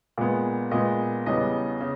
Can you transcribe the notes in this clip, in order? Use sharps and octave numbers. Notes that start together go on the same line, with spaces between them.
A#2 G#3 B3
A#2 G#3 B3 D#5
E2 C#3 G3 B3 D#5
C#3